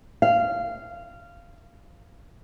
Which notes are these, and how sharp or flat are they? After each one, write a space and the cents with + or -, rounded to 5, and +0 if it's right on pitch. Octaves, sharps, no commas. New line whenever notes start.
F5 -15